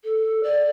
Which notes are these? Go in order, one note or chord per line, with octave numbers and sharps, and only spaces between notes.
A4
D5